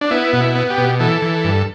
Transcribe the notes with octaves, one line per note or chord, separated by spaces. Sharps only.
D4
B3 E4
B2
E4
B3
G4
B2
E3 A4
E3
G2